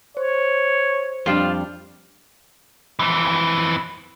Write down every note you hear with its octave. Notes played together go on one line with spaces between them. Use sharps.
C5 C#5
F2 G3 D4 F4
F2 E3